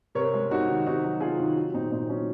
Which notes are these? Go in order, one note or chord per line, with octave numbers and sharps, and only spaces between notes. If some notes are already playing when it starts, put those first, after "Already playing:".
C3 A#4 C#5
G#3
C3 D#4 F#4
D#3
C3 D#4 F#4
F#3
C3 F4 G#4
D#3
F#3
A#2 C4 D#4
A#2 C4 D#4
F#3 C#4